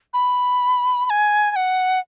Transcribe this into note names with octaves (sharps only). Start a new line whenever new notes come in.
B5
B5
G#5
G#5
F#5